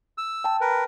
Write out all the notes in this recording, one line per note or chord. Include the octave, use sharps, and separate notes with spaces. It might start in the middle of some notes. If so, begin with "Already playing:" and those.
E6
G5 A5
A#4 B4